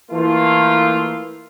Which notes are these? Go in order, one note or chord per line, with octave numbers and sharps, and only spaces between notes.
E3 A3 A#3 F4